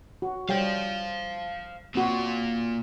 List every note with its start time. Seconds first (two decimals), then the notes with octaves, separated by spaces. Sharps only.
0.22 F#4
0.49 G3 C5 C#5 F5 G5
1.95 A#2 C4 F4 F#4